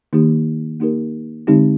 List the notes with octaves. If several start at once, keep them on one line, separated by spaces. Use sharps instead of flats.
D#3 A#3 D#4 G4
A#3 D#4 G4 A#4
D3 G#3 C4 D#4 G4